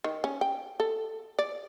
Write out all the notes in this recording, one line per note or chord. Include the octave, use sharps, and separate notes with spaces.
D#3
C#4
G5
A4
D5